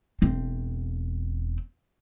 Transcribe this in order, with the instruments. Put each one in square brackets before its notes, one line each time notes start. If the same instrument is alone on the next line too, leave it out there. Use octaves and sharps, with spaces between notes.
[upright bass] E1 C4